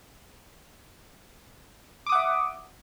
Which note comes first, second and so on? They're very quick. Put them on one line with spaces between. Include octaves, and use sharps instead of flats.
D6 D#6 F#5 E5